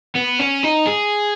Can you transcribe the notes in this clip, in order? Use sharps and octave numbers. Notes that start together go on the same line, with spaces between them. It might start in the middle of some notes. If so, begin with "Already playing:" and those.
B3
C#4
D#4
G#4